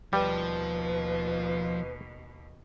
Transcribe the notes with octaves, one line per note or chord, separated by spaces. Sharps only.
D#2 B2 F3 G3 B4